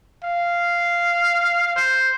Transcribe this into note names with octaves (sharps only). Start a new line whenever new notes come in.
F5
C5